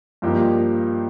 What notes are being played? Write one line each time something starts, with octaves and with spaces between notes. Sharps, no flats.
G2 F3 A#3 D#4 G4